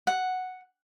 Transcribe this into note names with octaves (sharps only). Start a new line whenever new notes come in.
F#5